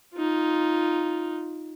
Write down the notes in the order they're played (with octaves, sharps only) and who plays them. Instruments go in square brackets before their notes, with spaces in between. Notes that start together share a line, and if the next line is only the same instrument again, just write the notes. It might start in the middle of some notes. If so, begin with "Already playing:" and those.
[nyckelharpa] D#4 F4